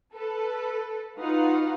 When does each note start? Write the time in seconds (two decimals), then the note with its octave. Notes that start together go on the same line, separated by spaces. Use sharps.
0.13 A4 B4
1.17 D#4 F4 F#4 B4 F5 F#5